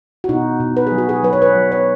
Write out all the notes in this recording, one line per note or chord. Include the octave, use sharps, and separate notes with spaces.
F#4
B2 D#4
B2
B4
F#3 G#4
F#4
G#4
F#3 B4
C#5
B4
F#3
C#5